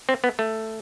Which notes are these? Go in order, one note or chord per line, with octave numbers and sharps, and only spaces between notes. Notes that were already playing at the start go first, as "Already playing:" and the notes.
C4
B3
A3